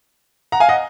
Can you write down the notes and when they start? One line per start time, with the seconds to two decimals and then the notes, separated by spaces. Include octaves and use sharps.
0.52 F#5 A#5
0.60 F5 G#5
0.69 D#5 F#5